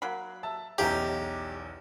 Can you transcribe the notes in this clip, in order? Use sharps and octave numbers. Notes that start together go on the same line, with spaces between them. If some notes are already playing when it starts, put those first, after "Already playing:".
F#3 A#3 B5
E5 A5 E6
B1 E2 F3 C#4 E4 G4 A#5